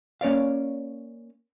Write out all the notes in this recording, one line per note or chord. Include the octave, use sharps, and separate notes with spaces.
A#3 C#4 C#5 D5 F5